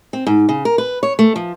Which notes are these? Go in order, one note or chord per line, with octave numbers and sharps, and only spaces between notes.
C4
G#2
C#3
A#4
B4
C#5
A3
F3